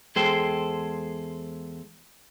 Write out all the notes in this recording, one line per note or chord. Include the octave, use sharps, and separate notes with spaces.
E2 G#3 G#4 A4 C5 G5